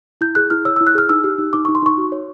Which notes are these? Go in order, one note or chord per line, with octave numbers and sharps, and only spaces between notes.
E4 G6
G#4 F#6
E4 F6
C#5 E6
E4 E6
F#6
G#4 F6
D#4 E6
G4
D#4
D#4 D6
D#4 C#6
C6
D#4 C#6
F#4
C#5